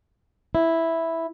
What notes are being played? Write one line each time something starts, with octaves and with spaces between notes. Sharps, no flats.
E4